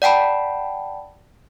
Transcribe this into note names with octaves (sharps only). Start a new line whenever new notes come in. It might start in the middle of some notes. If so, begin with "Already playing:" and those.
D5 F#5 G5 A5 B5